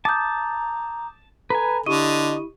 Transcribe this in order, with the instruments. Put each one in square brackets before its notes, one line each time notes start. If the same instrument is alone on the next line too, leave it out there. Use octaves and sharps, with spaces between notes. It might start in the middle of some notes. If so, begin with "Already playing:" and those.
[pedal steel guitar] A5 [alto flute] A#5 [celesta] D6 D#6 G6
[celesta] A4 [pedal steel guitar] B4 G#5 [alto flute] A#5
[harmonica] D3 [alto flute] E4 [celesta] G4 C#6 D#7 [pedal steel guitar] D#5